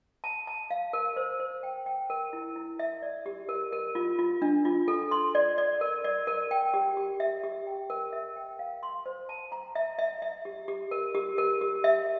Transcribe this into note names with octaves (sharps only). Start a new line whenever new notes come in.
A5
A5
F5
A#4
C5
C5
G5
G5
A#4
E4
E4
E5
D5
G4
A#4
A#4
F4
F4
D4
F4
A4
C6
D5
D5
A#4
D5
A#4
G5
G4
G4
E5
G4
G5
A#4
E5
G5
F5
C6
C5
A5
A#5
E5
E5
E5
G4
G4
A#4
G4
A#4
G4
E5